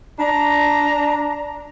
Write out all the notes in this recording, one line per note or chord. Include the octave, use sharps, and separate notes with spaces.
D4 A#5